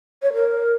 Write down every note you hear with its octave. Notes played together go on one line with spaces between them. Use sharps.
C#5
A#4